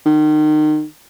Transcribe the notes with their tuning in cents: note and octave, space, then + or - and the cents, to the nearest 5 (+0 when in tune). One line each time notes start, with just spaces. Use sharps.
D#3 -30